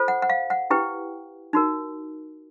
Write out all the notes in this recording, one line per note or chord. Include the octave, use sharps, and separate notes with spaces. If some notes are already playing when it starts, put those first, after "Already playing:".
Already playing: F4 A4 C5
F#5
F#5
F5
F#5
E4 G4 B4 G5
D#4 F#4 A#4